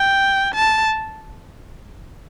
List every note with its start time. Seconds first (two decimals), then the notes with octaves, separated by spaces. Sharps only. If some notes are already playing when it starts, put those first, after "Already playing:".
Already playing: G5
0.54 A5